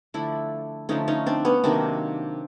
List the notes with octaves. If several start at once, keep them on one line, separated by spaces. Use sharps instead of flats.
D3 F3 A3 D4 E4
D3 F3 A3 C#4 D#4
C#4 D#4
C4 D4
B3 C#4
C3 D#3 F#3 A#3 C4 D4